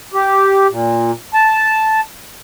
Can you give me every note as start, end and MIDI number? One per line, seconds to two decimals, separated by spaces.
0.14 0.67 67
0.70 1.11 46
1.34 2.00 81